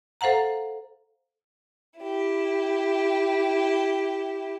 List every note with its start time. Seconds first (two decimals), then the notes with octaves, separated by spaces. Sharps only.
0.21 A4 C5 F5 F#5 A#5
2.00 E4 G4